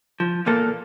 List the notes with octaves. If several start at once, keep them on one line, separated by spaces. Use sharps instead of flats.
F3
E2 A#2 A#3 A4